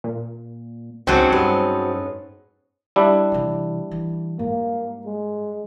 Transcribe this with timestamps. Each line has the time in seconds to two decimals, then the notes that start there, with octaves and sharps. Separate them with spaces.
0.04 A#2
1.07 C#2 G#2 F#3 C4 C#4 A4
1.32 G2 B3
2.96 G3 D4 E4
3.32 C3 E3
3.91 E3
4.39 G#2 A#3
5.06 G#3